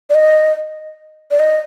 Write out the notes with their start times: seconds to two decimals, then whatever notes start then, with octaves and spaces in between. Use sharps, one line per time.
0.10 D5
0.15 D#5
1.31 D5
1.40 D#5